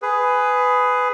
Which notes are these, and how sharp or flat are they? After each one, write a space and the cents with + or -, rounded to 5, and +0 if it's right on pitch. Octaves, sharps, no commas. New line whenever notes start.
G#4 +5 B4 +15